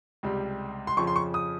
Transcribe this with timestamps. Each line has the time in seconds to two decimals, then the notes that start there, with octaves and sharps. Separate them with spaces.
0.23 C#2 C3 G3
0.87 C6
0.97 F2 C#3 F3 C#6
1.07 C6
1.16 C#6
1.34 D#6